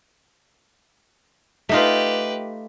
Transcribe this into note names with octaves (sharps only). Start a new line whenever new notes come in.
A3 D#4 F4 G4 B4